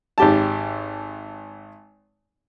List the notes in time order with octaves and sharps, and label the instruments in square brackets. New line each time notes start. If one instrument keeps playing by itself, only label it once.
[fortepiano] G#1 G4 A5